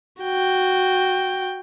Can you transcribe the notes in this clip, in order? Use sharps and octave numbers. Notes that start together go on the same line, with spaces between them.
F#4 G5